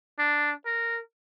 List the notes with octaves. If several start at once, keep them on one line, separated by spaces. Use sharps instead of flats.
D4
A#4